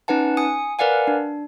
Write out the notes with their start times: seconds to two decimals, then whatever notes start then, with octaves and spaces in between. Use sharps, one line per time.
0.08 C#4 D#4 B4 F#5 A5
0.37 G#5 D#6 C#7
0.79 A#4 B4 D5 F5 F#5 G#5
1.07 D4